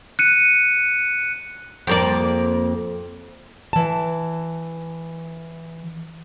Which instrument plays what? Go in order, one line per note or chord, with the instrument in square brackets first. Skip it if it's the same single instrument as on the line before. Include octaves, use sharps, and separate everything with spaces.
[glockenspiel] F#6 C#7 D#7
[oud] F2 A#3 D5
[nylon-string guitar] E3 A5